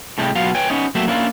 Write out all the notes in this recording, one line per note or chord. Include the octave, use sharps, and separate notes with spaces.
A2 C3 G3 G#3
B2 F#3 B3 F4 F5
B4 C#5 G5 G#5
B3 C#4 D#4
F#3 A3 A#3 C4 C5 E5
A#3 C#4 D4 E4 F4